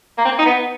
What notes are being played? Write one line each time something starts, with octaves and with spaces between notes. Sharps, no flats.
A#3
C4
A#3
D#4
B3